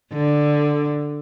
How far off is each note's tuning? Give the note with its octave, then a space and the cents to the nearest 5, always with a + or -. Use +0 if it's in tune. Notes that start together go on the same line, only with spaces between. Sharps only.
D3 +5